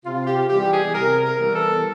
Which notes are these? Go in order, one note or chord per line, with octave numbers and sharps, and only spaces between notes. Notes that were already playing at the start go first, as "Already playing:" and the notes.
C3 F4
G4
E3 G3 B3 G4
G#4
C3 A#4
A#4
E3 G3 B3
A4